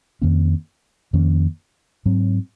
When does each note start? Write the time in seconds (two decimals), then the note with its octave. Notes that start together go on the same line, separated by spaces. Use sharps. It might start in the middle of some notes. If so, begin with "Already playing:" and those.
0.22 F2 D#3 A#3 C#4
1.13 F2 D#3 A#3 C#4
2.06 G#2 F#3 C4